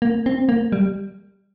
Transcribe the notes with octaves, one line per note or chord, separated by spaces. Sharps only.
A#3
C4
A#3
G3